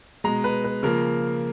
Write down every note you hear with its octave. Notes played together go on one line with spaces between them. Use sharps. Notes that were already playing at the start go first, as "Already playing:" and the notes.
B2 G#3 A#5
B4
B4
C#3 F3 A#3 A#4